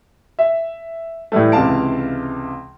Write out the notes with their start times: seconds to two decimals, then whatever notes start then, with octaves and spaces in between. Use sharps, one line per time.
0.39 E5
1.32 A2 E3 G3 A3
1.52 C#2 C3 E3 F5 A5 D7